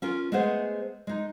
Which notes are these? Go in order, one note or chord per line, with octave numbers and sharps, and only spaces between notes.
C#4 F4 A#4
G#3 A3 B3 G#4 C5 F#5
G#3 D#4